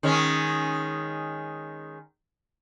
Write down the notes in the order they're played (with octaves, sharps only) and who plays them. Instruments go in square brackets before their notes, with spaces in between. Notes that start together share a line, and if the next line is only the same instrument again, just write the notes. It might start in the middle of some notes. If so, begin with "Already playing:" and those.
[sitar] D#3 G#3 C#4